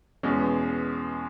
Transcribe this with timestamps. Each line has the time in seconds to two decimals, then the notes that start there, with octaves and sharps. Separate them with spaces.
0.23 E2 B2 G#3 C#4